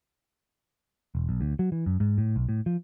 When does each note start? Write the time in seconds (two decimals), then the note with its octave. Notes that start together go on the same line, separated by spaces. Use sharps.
1.15 E1
1.29 B1
1.41 D2
1.59 F#3
1.72 E3
1.86 F#2
2.00 G#2
2.18 A2
2.36 B1
2.49 A2
2.66 F3